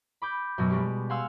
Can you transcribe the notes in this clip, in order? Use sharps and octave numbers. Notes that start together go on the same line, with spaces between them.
B5 D6 G6
F#2 B2 F#3
G3 G#3 G4
F5 F#5 G#5 C6 E6